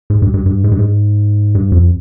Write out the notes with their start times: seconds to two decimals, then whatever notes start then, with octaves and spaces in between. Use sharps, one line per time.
0.10 G#2
0.22 G2
0.34 G2
0.46 G2
0.64 G#2
0.72 G2
0.79 G#2
1.55 G2
1.72 F2